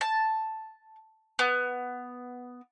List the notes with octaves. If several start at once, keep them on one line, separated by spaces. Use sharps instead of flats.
A5
B3